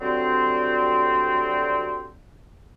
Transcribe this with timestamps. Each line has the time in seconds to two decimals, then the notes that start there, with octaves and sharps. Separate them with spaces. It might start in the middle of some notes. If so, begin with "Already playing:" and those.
0.02 D2 D3 F#3 G3 C4